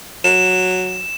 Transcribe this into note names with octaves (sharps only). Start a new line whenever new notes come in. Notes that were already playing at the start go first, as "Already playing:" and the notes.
F#3 E7